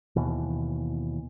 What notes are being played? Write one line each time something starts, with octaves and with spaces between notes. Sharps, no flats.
D#2 B2 E3